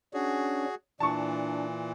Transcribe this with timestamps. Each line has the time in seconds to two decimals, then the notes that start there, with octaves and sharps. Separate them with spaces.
0.14 C#4 D4 F#4 G#4
1.00 A#2 E3 D4 A5 C#6